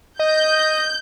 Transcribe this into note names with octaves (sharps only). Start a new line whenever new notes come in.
D#5 G6